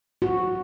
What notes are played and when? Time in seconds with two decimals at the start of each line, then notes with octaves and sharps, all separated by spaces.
0.22 F#4